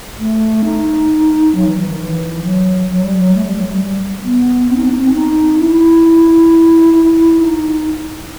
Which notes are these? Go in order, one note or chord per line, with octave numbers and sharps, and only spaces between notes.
A3
D#4
F#3
E3
E3
D#3
E3
F#3
F#3
G3
F#3
A3
G3
F#3
G3
B3
C4
D#4
C4
D#4
C4
D#4
E4
E4
D#4